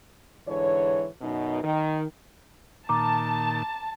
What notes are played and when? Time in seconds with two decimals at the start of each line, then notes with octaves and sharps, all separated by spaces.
0.46 G#2 D3 E3 C#5
1.21 F#2 B2 D#4
1.63 D#3
2.89 A#2 D#3 A5 A#5 D6